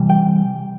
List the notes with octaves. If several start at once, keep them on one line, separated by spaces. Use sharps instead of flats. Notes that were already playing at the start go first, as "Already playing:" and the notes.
Already playing: C3 E3 G3
G5